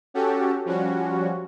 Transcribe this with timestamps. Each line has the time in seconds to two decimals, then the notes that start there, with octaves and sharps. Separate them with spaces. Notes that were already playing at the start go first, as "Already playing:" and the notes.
0.14 C#4 F#4 G4 A4
0.65 F3 G3 C#4 F#4